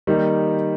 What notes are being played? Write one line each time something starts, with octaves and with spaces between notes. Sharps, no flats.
D#3 G3 A#3 D#4 G4